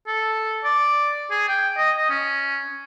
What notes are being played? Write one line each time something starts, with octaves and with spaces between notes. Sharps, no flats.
A4
D5
G#4
G5
D#5
D#5
C#4